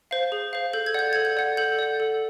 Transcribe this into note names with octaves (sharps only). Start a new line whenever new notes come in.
C5 F5
G#4
C5 F5
A4 G6
G#6
D5 F#5 G6
A4 G#6
G6
D5 F#5
A4 G6
D5 F#5
A4